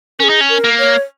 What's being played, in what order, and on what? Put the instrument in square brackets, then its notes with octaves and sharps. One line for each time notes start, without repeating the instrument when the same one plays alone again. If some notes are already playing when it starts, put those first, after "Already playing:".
[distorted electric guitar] C#4 [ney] G#4 A#4
[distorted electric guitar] D#4
C#4
[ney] A#4
[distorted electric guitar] A#3
[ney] C#5